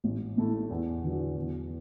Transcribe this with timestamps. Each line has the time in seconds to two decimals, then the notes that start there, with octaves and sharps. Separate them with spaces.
0.04 A1
0.37 A2 A3 E4
0.70 E2
1.03 D3 F#3
1.37 E2